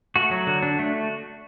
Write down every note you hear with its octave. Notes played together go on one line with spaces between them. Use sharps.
A3 F#4
F#3
D3
D4
A3